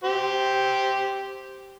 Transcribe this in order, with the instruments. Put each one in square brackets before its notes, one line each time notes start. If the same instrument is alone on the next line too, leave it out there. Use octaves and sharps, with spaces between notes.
[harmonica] G4 C5